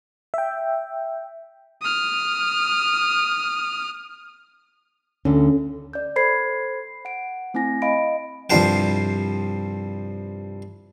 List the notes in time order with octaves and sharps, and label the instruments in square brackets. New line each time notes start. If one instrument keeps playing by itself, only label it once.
[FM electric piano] E5 G5
[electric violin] D#6 F6
[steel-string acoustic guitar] D2 D3 [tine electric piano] C#4
[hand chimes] D5 G6
A4 C5 B5 G#6 C7
F#5 D7
A3 C4 E4 G#5 A#6
D#5 F5 B5 D7
[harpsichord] C2 G2 F3 C5 G5